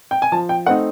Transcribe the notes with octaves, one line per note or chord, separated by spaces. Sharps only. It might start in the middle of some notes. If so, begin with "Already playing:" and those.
G5
G#5
F3 A5
G5
A3 C4 D#4 F#5